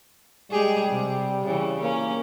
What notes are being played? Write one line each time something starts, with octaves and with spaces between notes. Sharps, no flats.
G3 G#3 G4 G#4
C3
C#3 E3
A#3 C#4